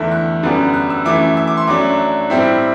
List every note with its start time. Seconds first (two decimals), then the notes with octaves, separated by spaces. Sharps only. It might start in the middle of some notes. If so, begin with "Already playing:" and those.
Already playing: E2 D3 A3 E4
0.12 F#6
0.43 F#2 D3 G3 B3
0.74 F#6
0.90 E6
1.05 F#2 E3 A3 E4 D6
1.37 E6
1.47 D6
1.57 C6
1.67 F#2 F#3 A3 D4 D6
2.30 A2 G3 C4 E4